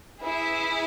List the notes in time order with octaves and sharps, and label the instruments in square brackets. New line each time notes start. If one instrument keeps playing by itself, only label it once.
[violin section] E4 G#4 B4 E5